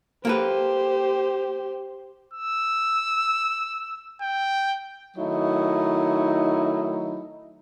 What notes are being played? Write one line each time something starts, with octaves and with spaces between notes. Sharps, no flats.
A#3 G4 A4 B4 C5
E6
G5
D#3 F#3 A3 D#4 E4